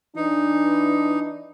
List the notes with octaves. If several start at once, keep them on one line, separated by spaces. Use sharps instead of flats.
E3 D4 D#4